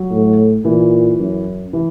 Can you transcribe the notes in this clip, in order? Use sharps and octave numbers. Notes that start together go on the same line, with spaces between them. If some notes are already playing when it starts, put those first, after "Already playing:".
Already playing: F#3
A2
A#2 E3
F#2
E3